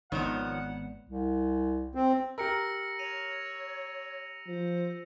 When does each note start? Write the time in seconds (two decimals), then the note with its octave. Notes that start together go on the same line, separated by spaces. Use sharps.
0.12 G#1 D#3 F3 G#3 B3 C#5 D5 F#5
1.09 C2
1.95 C4
2.38 G4 A#4 E6 A#6 C#7
2.99 C#5 D#7 F7
4.48 F3 C5